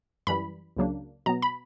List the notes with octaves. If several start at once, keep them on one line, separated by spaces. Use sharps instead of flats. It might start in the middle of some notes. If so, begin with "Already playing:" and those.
F#2 E3 G3 B5
C#2 C#3 F#3 A#3 D4
B2 F#3 B3 A#5
B5